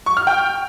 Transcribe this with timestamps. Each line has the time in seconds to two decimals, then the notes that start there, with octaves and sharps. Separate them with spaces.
0.06 C#6
0.17 F6
0.27 G5